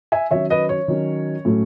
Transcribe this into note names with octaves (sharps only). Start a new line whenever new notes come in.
E5 G#5
D#3 F#3 C#4 C#5 E5
B4 D#5
C#5
D#3 F#3 C#4
A2 F#3 A3 C#4